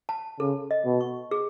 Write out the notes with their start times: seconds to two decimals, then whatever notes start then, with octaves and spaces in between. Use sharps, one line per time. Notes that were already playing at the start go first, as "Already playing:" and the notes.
0.09 A5
0.40 C#3 A4
0.71 D#5
0.86 B2
1.01 C#6
1.31 G#4